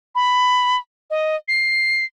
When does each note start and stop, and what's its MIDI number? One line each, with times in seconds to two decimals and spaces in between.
0.15 0.77 83
1.10 1.36 75
1.48 2.05 96